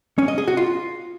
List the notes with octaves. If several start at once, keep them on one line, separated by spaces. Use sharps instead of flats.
C#4
D#5
G#4
F#4
F4